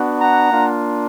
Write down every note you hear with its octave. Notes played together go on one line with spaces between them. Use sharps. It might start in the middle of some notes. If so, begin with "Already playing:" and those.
Already playing: B3 D4 F#4
F#5 A#5
A#3 D4 F4